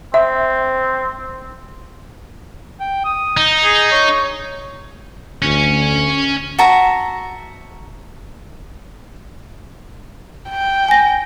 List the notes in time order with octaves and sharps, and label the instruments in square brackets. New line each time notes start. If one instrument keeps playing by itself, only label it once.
[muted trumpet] C4 [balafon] E5
[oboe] G5
D#6
[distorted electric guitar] D#4
[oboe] G#4
C#5
[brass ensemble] D2 [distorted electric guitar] C#4
[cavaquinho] F#4 E5 A5 A#5
[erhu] G5
[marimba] G#5 A#6